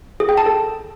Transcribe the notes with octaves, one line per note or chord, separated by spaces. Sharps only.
G#4
G5
A5
A4